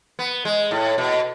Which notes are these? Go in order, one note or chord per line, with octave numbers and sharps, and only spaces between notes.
B3
G#3
A2
B2